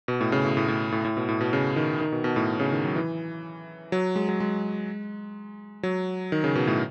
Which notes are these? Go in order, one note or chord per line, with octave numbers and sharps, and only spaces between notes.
B2
A2
C#3
A2
A2
A2
A2
A2
B2
A2
B2
C#3
D#3
D#3
B2
B2
A2
C#3
D#3
F#3
E3
F#3
G#3
F#3
G#3
F#3
D#3
C#3
B2
A2